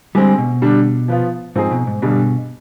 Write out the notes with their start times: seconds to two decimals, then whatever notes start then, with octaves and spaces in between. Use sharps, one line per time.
0.15 D3 G3 G#3 C4
0.38 B2
0.62 D3 G3 D4
1.08 F3 B3 F4
1.55 G#2 F3 C4 D#4 G#4
1.71 B2
1.87 G#2
2.02 G2 B2 D3 G3 D4 G#4